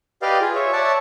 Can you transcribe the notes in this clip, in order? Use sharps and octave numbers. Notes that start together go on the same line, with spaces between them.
G4 B4 D5 D#5 F5
F4 G#4
C#5 E5
C#5 D5 E5 F#5 A5